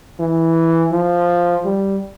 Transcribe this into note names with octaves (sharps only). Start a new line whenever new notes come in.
E3
F3
G3